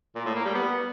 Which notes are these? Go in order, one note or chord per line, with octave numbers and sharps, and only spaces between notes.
A#2
A2
A#3
G3
B3